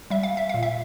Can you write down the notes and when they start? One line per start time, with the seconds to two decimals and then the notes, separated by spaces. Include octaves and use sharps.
0.10 G3 E5
0.23 F5
0.37 E5
0.49 A#2 F5
0.63 E5